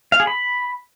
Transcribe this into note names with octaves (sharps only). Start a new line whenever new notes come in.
F5
G#4
B5